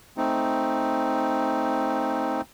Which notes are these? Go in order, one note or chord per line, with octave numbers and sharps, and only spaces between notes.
A3 C4 D#4